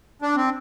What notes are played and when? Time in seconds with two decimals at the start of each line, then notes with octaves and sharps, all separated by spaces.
0.22 D4
0.36 C4